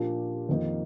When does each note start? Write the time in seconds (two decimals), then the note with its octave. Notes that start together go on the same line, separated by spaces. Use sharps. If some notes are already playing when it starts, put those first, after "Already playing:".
Already playing: A#2 F3 A#3 D4 G4
0.49 F2 D#3 A#3 D#4 A#4